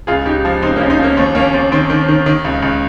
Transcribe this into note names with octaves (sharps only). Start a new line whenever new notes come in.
C#2 F4 G#4
C#2 D#4 G4
F3
C#2 C4 D#4
A#3 C#4
C#2
C4 D#4
F3 A#3 C#4
D#2 C4
D#2 A#3 C#4
D#2 C4
D#3 C4
D#3
D#3
D#3
C#2
C#2